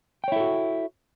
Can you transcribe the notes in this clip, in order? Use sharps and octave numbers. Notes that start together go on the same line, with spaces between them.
E4 F#4 A4 C#5 G5